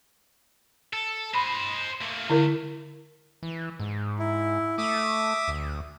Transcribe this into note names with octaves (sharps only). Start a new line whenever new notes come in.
A4
C5 D#5 B5
A3 A#3
D3 E4 A#4
E3
G#2
E4
A3 E5 D6 D#6
D2